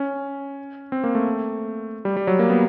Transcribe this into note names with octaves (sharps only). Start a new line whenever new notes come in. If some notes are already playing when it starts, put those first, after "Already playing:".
Already playing: C#4
C4
A#3
A3
G3
G3
F#3
A#3
B3